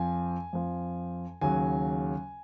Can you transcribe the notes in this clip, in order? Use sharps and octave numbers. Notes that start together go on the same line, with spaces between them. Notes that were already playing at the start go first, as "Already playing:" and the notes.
Already playing: F2 F3 G#5
F2 F3
D#2 C#3 F#3 G#5